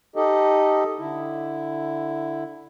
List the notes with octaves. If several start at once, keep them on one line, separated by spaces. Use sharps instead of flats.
D#4 G4 A4 D#5
D3 E4